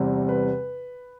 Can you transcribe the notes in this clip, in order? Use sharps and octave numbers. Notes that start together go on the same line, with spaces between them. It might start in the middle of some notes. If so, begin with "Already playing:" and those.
Already playing: E2 C3 G3 C4
B4